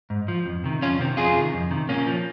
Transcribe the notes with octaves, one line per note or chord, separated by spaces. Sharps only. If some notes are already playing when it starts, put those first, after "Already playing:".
G#2
F3
F2
C3 D#3
F2 C#4 F4
C3 D#3 C4
F2 F4 G#4
C3 D#3
F2
C3 D#3
A#2 A#3 C#4
F3